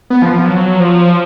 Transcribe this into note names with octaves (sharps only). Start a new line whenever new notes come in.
B3
F3
F3
F#3
F3